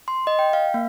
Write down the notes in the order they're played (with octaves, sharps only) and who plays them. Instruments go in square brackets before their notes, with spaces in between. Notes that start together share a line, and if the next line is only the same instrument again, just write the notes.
[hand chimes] C6
D#5
G5
F5
A#3